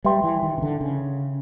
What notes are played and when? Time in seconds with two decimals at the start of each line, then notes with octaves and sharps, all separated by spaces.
0.04 G3 B4 E5 G5 C6
0.24 E3
0.43 D#3
0.58 C#3
0.62 D3
0.81 C#3